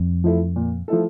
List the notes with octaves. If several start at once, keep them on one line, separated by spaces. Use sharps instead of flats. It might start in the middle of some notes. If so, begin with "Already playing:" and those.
Already playing: F2
F3 A3 E4 A4
A#2
F3 A3 E4 A4